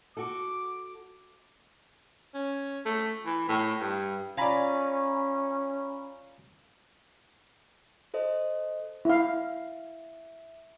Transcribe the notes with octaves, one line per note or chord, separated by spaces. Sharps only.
F#4 A4 D6
C#4
A3
E3
A2
G2
C#4 F4 D5 G#5 A#5 B5
A4 C5 D#5
E4 E5 F5